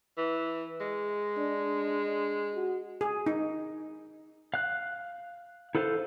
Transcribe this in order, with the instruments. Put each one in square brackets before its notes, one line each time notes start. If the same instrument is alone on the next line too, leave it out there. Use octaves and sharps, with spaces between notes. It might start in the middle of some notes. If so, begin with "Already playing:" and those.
[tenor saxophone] E3
G#3
[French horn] D4
F#4
[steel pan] G#4
D#4
[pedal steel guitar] F5 F#6
E4 A4 B4 C5 F5